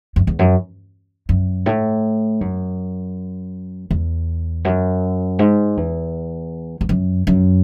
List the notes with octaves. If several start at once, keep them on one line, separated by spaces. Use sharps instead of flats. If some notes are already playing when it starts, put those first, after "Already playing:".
F#2
E2
F#2
F#2
A2
F#2
E2
F#2
G#2
E2
E2
F#2
F#2